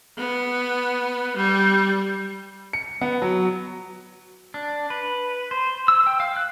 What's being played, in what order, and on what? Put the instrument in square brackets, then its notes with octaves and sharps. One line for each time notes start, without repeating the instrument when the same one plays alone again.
[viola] B3
G3
[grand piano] C#7
B3
F#3
[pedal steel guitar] D4
B4
C5
E6
G5
F5
F#6